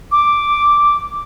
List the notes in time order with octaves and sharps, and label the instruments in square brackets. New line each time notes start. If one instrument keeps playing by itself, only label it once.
[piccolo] D6